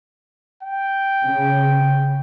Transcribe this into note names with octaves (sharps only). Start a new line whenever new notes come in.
G5
C#3